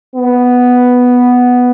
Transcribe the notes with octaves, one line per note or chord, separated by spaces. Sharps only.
B3